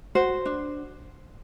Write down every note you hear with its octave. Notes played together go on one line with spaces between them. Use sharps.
F#4 C5
D4